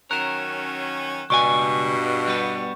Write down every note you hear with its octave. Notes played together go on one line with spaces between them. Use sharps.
D#3 F#3 C#4 A#4 F#6 E7
C#2 G2 B2 D5 G#5 C#6
G3 B3